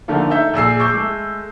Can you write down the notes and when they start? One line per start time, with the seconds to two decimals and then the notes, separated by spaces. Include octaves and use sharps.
0.08 D3 D#3 F3 A3 A#3
0.30 D#4 A4 E5 G6
0.54 A#1 G#4 E6 C7
0.79 C#6 D6 E6 G6
0.94 G#3 A3